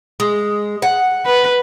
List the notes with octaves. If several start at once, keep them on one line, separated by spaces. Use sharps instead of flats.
G#3
F#5
B4